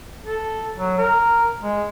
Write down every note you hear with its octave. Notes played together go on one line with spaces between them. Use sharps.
A4
F#3
A#4
G#3